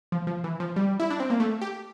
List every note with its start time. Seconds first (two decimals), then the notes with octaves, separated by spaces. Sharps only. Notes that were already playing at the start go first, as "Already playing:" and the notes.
0.12 F3
0.27 F3
0.44 E3
0.60 F3
0.76 G3
1.00 E4
1.10 D4
1.20 C4
1.30 A#3
1.40 A3
1.61 G4